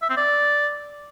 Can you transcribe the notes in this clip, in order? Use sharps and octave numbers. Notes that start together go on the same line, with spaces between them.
E5
C4
D5